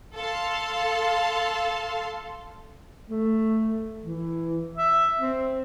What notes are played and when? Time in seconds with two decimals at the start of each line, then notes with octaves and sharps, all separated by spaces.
0.16 A4 F5 A5 C6
3.10 A3
4.03 E3
4.78 E5
5.19 C4